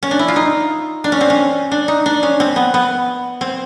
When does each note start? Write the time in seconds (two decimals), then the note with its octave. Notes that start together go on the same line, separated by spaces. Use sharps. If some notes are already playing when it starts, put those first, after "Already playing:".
0.03 C#4
0.11 D4
0.19 E4
0.28 F4
0.36 D#4
1.04 D4
1.12 C#4
1.21 C4
1.30 C#4
1.71 D4
1.88 D#4
2.06 D4
2.23 C#4
2.40 C4
2.56 B3
2.74 B3
3.41 C4